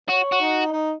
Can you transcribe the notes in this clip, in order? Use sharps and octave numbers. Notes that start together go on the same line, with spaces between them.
F#4 C#5
F#4
D#4
D#4